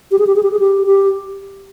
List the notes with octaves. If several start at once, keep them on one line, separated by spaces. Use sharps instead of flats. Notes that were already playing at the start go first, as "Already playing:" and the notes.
G4
G#4
G4
G#4
G4
G#4
G4
G4